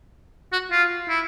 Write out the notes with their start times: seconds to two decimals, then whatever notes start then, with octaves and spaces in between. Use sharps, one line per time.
0.53 F#4
0.72 F4
1.09 E4